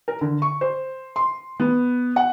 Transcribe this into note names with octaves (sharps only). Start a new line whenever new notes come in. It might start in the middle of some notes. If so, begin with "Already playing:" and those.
A#4
D3
C#6
C5
C6
B3
F#5